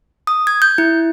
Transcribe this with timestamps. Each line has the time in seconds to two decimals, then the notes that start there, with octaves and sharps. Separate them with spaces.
0.27 D#6
0.47 G#6
0.62 G6
0.78 E4